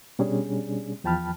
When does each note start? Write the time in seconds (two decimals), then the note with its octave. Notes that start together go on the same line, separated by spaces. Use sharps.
0.19 B2 G3 C#4 D4 G#4
1.04 E2 F3 G5 A5 B5 F6